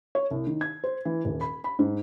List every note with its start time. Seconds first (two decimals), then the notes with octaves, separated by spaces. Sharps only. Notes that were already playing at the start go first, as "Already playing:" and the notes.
0.15 C#5
0.31 C2
0.47 D#3
0.61 G#6
0.84 C5
1.05 E3
1.25 D#1
1.41 B5
1.64 B5
1.79 G#2